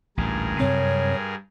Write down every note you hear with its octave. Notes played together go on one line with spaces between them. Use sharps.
A1 D2 G2 A#2 G#4 A#4
F#2 C3 C4 C#5